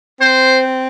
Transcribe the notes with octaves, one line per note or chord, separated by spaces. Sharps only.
C4 C5